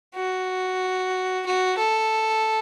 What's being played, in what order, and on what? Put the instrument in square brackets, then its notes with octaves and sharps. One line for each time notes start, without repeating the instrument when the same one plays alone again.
[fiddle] F#4
F#4
A4